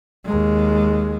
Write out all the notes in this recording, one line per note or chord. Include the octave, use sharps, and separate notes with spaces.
D#2 G#3